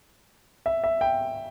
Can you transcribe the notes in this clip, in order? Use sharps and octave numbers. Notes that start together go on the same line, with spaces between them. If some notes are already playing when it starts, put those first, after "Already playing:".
E5
E5
G5